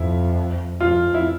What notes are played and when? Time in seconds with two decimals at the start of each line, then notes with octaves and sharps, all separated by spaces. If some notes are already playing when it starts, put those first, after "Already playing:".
Already playing: F2 E4
0.80 F2 F4
1.14 E4